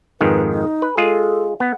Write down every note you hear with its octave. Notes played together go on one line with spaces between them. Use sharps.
F2 G#2 D#3 B4
D#4
B4
G#3 F4 G#4 A4
B3 F#5